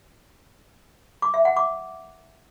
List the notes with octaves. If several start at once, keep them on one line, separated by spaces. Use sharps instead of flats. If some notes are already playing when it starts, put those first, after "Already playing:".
D6
E5
F#5
D6